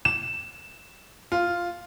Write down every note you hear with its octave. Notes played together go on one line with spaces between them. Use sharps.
E7
F4